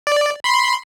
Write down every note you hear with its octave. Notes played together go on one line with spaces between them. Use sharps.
D5
B5 C6 C7